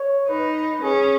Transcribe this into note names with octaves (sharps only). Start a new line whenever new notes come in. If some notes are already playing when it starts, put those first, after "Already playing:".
Already playing: C#5
D#4 B4
C#4 G#4